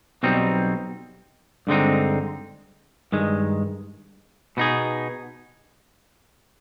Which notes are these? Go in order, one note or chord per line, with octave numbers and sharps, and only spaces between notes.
B1 B2 G3 C4 D#4
G2 D3 G#3 C4 D#4
G2 D#3 G#3
B2 B3 D#4 G#4